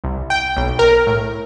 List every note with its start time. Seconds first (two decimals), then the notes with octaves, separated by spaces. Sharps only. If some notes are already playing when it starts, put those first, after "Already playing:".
0.04 C2
0.30 G5
0.56 B1
0.79 A#4
1.07 A2